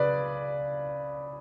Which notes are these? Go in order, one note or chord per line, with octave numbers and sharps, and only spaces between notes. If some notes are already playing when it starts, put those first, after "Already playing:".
Already playing: C#3 B4 D5